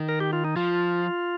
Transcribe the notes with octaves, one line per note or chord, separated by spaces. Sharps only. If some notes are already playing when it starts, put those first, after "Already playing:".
Already playing: D#3
A#4
G4
F4
D#4
F3 F4